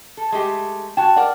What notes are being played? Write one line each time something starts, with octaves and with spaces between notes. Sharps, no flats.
A4
G#3 A3 G4
F#4 G5 A5
A#4 D5 F#5